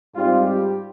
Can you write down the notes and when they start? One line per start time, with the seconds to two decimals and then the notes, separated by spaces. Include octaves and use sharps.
0.15 G#2 G3 C4 F4
0.46 G4